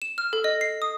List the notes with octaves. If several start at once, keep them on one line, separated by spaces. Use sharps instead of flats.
E7
F6
A4
D#5
C7
D#6